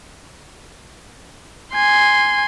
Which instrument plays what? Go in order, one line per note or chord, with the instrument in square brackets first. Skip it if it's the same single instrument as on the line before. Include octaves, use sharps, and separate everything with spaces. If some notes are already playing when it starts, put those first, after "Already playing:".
[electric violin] G#5 C6